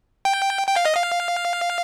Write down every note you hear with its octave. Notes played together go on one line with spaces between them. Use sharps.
G5
G5
F5
D#5
F5